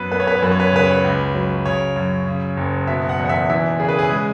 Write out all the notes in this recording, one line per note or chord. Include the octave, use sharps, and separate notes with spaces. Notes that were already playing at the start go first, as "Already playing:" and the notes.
Already playing: F#2 B3 B4
B3 B4
C#5
B4
C#5
F#2 B4
C#5
B4
C#5
C#3 B4
C#5
B4
C#2
F#3
C#3 C#5
F#2
C#3
F#1
B2 E5
F#5
E2
F#5
E5
E3 E5
C#3 G#4
B4
G#4
G#3